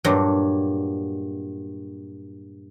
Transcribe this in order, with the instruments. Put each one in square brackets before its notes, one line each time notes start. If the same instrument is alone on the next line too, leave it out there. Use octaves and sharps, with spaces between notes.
[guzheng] G2 A#2 F#3